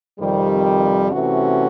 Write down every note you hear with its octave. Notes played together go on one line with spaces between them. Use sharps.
F2 C3 D#3 G3
C3 E3 A3 C#4 F#4